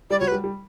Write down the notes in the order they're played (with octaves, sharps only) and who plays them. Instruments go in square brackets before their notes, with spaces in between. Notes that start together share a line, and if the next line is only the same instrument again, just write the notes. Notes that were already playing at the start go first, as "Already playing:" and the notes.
[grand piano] G3 [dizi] D5
[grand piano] F#3 [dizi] C#5
[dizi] B4
[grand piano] G3
G3